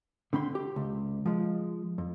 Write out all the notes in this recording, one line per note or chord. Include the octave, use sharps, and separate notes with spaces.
D3 C4 B5 C6
G4
C#2
F3 G#3
F2